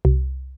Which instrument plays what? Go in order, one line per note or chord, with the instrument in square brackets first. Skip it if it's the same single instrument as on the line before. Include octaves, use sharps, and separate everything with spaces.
[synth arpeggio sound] C2